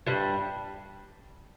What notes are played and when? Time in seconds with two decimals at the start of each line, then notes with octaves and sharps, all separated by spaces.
0.07 G2 G3